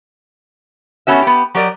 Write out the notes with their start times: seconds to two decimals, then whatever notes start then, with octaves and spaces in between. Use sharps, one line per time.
1.07 A3 B3 C#4 F#4 E5
1.22 B3 G4
1.55 F#3 G4 A#4 D5 D#5